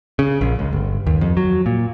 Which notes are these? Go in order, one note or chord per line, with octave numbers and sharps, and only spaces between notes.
C#3
A#1
C#2
G1
D#2
F2
F#3
A#2